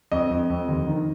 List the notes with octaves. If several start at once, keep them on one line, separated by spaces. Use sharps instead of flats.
F2 D#5
F2
F2
D#2
D#3